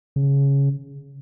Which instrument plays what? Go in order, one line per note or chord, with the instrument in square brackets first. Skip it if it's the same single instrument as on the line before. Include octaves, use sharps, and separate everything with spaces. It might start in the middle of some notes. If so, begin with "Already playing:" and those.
[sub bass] C#3